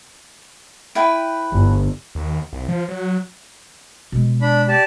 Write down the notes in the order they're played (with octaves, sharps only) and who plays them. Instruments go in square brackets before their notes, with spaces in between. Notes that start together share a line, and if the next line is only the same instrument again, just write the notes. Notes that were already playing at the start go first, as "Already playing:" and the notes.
[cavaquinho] E4 B4 G5
[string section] G1
[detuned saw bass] D#2
C2
F3
F#3
[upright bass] B2 G#3
[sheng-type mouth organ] D4 B5
G4 D5 A5